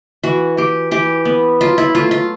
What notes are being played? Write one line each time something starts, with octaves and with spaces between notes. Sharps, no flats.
E3 F#4
E3 G4
E3 G4
B3
F#3 F4
E4
A3 F4
F4